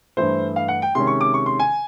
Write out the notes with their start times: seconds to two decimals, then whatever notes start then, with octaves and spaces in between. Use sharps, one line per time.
0.17 G2 E3 A3 C5
0.56 F5
0.68 F#5
0.82 G5
0.95 C3 D#3 G#3 C#4 C6
1.07 C#6
1.21 D6
1.34 C#6
1.46 C6
1.60 G#5